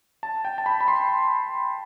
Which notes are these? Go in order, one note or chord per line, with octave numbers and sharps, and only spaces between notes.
A5
G5
A5
B5
B5
C6